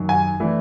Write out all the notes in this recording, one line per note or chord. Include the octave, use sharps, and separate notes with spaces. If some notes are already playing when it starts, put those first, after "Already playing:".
Already playing: F#2 D#3 F#3
G#5
E3 A3 D4